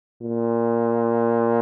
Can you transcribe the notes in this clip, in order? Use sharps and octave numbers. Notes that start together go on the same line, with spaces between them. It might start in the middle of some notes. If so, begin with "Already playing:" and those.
A#2